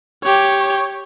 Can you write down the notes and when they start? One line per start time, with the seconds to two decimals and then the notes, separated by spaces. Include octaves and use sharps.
0.24 G4 C#5